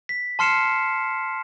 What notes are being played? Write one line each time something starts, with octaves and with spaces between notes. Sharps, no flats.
B6
A5 C6 F6 C7 C#7 E7